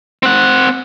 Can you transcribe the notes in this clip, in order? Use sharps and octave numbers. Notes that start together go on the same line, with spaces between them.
C4 F#5